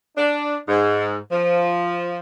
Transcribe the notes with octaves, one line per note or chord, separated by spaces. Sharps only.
D4
G#2
F3